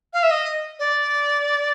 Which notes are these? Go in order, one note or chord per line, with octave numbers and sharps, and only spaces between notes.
F5
E5
D#5
D5